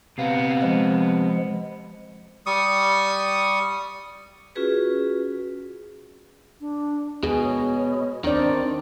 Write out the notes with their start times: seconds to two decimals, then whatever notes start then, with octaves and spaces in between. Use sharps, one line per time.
0.18 C3 B3 F5
0.62 F3 G#3
2.46 G3 C#6 D#6
4.55 C#4 F4 F#4 G#4 B4
6.61 D4
7.23 B2 D#3 G#4
7.43 C#5
8.24 D#3 C4 D4 D5